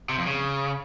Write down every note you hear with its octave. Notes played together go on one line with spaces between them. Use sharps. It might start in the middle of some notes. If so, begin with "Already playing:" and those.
C3
F2
C#3